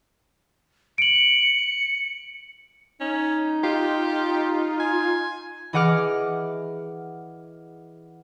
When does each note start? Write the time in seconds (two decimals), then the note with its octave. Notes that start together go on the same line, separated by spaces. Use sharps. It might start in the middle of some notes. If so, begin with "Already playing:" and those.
0.98 C#7 D7 F#7
3.00 C#4 D#4
3.63 F4 G4
4.80 G#5
5.73 E3 G#4 D#5 F#5 D6 F6